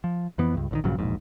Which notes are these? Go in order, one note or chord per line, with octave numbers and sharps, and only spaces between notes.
F3
F2 E3 B3
C#2 G2
A#1 D3 D#3
A#1 G2 C#3 F#3
E1 A#1 G#2